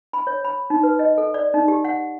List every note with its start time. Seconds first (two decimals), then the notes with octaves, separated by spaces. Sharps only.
0.13 B5
0.27 C#5
0.44 B5
0.70 D#4
0.83 B4
0.99 D#5
1.18 A4
1.34 D5
1.54 D#4
1.68 G4
1.85 F#5